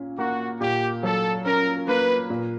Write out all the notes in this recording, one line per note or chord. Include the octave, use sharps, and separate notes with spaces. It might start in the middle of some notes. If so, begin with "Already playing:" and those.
Already playing: A#2 C#4
A#3 F#4
A#2 G4
F#3 A4
C#4 A#4
A#3 B4
A#2